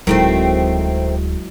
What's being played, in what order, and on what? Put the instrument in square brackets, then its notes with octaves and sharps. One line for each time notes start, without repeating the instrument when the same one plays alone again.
[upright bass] D1 [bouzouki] D#3 A3 C4 [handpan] F#3 G#3 E4